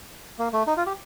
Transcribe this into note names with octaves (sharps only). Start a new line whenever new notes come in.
A#3
A3
D#4
F4
G4